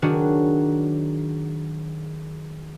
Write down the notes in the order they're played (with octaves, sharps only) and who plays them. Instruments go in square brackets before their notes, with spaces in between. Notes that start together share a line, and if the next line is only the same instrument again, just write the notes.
[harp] D#3 F#3 D4 F#4 G#4 C#5